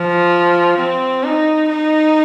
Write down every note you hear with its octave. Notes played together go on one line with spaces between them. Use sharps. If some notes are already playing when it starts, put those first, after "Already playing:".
Already playing: F3
C4
D#4
D#4